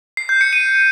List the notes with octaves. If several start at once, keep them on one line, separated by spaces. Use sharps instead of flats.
C7
G6
C#7
D#7